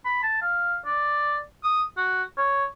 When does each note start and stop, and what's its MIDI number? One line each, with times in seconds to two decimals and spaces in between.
0.05 0.19 83
0.23 0.41 81
0.42 0.77 77
0.86 1.38 74
1.63 1.84 87
1.98 2.23 66
2.38 2.65 73